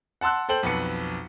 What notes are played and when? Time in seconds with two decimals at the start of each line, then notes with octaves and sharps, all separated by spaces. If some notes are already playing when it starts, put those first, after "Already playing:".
0.21 F#5 A5 C6 E6 F#6
0.49 A4 C5 G5 F#7
0.63 B1 F2 B4 C#7